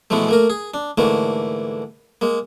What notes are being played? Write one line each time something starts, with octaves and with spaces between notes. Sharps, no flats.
B2 E3 F3 G#3 A3
A3 A#3 A#4
G#4
D4
G#2 D3 E3 A3 A#3
G#3 A#3